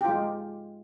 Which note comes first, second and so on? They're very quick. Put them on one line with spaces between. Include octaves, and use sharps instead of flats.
G4 F4 G#3